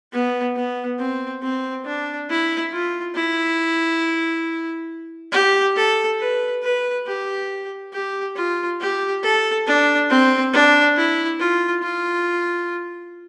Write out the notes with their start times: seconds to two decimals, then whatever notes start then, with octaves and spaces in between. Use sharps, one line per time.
0.13 B3
0.56 B3
0.99 C4
1.43 C4
1.85 D4
2.29 E4
2.72 F4
3.15 E4
5.32 G4
5.76 A4
6.20 B4
6.63 B4
7.07 G4
7.93 G4
8.36 F4
8.80 G4
9.23 A4
9.67 D4
10.10 C4
10.53 D4
10.97 E4
11.40 F4
11.83 F4